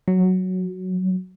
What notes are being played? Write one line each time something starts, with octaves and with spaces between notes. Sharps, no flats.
F#3